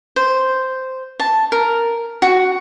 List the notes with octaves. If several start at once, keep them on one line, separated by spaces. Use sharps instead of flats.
C5
A5
A#4
F#4